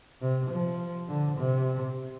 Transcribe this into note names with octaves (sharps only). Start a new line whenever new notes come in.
C3
F3
D3
C3